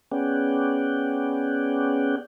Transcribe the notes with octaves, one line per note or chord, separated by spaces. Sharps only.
B3 C#4 G#4 D5 F#5 G5